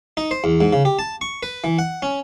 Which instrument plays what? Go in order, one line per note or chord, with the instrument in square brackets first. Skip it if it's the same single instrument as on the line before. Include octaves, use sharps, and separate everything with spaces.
[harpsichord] D#4
C5
E2
G#2
C#3
G4
A5
C#6
B4
E3
F#5
C#4